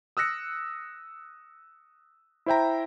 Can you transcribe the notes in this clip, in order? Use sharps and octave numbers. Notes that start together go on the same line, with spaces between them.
D#6 E6 F#6 A#6 C#7
E4 C5 E5 G5 A#5